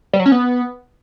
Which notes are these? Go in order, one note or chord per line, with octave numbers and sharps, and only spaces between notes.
G3
F#3
C#4
B3